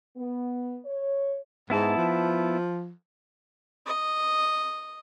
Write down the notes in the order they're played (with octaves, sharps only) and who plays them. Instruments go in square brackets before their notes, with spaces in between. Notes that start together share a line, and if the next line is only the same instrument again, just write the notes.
[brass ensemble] B3
C#5
[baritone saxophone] G#2 [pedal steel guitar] B3 E4 A5
[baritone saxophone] F3
[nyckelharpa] D#5